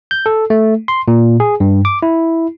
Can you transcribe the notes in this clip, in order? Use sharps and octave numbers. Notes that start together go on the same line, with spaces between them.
G6
A4
A3
C6
A#2
G#4
G2
D6
E4